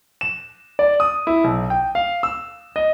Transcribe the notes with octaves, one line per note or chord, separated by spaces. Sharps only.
E7
D5
D#6
E4
B1
G5
F5
E6
D#5